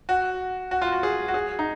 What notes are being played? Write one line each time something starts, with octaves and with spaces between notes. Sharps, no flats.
F#4
F#4
F4
F#4
G#4
F#4
G#4
D#4